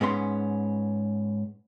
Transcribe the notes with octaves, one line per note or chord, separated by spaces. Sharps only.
G#2 B3 C#4 C6